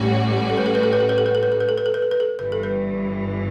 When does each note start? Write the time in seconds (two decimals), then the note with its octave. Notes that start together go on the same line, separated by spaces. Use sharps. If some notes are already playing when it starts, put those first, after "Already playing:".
Already playing: A1 A2 G3 C#4 F#4
0.50 A4
0.57 B4
0.66 A4
0.75 B4
0.83 A4
0.93 B4
1.00 A4
1.09 B4
1.18 A4
1.26 B4
1.35 A4
1.43 B4
1.52 A4
1.60 B4
1.69 A4
1.78 B4
1.86 A4
1.94 B4
2.02 A4
2.11 B4
2.20 A4
2.39 G1 G2 E3 B4
2.52 A4
2.63 B4